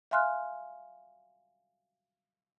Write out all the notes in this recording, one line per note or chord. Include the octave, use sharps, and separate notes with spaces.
E5 F5 G#5 C6 F6 F#6